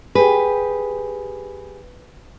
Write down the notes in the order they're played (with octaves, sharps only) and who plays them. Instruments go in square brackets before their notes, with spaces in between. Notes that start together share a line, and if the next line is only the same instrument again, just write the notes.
[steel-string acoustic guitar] G4 G#4 [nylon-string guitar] B4